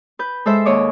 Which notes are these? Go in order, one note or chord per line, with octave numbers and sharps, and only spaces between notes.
B4 G6
G#3 A4 C5 E5
D#2 C#5 D#5 D6